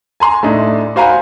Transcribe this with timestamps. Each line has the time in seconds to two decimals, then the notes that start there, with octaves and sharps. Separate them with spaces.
0.20 G#5 A#5 C6
0.43 A2 A3 D4 D#4
0.96 F#4 C5 F5 G#5 A#5 B5